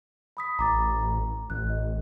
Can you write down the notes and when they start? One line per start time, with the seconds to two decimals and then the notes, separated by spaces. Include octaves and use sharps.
0.37 B5 D#6 B6
0.59 A1 A#5 D6 A6
0.99 A#5
1.50 A1 F#6
1.70 D#5